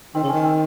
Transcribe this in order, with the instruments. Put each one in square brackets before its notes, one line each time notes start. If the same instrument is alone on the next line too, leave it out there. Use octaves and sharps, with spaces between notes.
[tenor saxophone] D#3 [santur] C4
[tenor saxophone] C#3
[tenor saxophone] D#3 [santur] C#4
[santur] C4